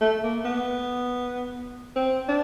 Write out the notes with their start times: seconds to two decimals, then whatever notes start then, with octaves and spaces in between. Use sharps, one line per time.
0.01 A3
0.24 A#3
0.45 B3
1.96 C4
2.28 D4